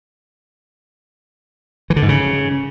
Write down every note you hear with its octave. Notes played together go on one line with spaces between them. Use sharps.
E3
D3
G#2
C#3